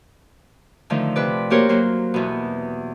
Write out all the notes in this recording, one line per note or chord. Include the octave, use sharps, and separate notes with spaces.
D3 D#3 F3 A3
C3 B4 D5
A#3 F#4 G4 A#4 C5 C#5
F#3 A#3 C5
E2 B2